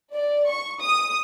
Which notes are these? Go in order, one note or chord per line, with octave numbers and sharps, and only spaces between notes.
D5
C#6
D#6